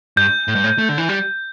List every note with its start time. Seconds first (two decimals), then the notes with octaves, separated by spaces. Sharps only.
0.17 G2 G6
0.48 A2
0.55 G2
0.64 A2
0.78 A3
0.89 D3
0.98 E3
1.09 G3